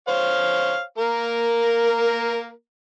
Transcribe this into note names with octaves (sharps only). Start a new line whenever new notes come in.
C5 C#5 F5
A#3 A#4